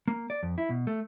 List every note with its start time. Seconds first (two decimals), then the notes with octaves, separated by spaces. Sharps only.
0.08 A#3
0.30 D5
0.43 F2
0.58 E4
0.70 B2
0.87 A3